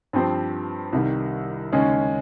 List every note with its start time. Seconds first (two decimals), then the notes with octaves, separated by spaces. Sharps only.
0.13 G2 F3 C4 G4 C5
0.93 C2 C3 D#3 G3
1.72 D#2 C#3 G#3 C#4